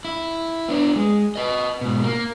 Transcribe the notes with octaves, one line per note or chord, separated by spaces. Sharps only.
E4
B3 D4
G#3
B4 D#5
G#2 B2
A#3